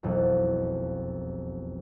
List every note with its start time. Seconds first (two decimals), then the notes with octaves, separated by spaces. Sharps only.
0.03 E1 B1 F2